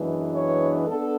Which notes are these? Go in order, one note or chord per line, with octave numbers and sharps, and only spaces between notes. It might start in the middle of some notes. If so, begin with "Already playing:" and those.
Already playing: F#2 E3 G#3 B3 D4
C#5
B3 D4 A4